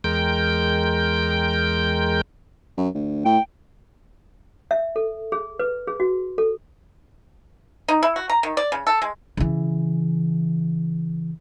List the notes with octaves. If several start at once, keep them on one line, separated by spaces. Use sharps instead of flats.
E2 G#3 A#4 G5 G6
F#2
D2
A2 G5
E5
A4
G#4
B4
G#4
F#4
A4
D#4
E4
F#4
A#5
D#3
D5
C#3
A4
G#3
C#3 E3